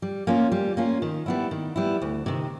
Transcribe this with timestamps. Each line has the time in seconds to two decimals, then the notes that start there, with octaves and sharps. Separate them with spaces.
0.02 G3
0.27 A#3 C#4 F4
0.52 G3
0.77 A#3 C#4 F4
1.02 D#3
1.26 G3 B3 E4
1.51 D#3
1.76 G3 B3 E4
2.02 D2
2.26 C3 D#3